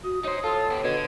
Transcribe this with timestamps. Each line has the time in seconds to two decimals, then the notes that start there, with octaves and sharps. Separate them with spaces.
0.04 F#4 D#6
0.24 D#4 C5 C#5
0.44 F4 A4
0.71 B3 G4
0.84 B2 D3 G#6